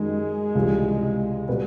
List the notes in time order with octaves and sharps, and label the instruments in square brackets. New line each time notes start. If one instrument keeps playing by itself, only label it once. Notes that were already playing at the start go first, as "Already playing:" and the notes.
Already playing: [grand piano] F#2 D#3 G3 [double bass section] G#3
[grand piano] C#2 C3 E3 G3
B2 G3 B3